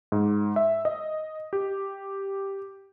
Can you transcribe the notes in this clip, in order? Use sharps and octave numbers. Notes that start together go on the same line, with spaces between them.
G#2
E5
D#5
G4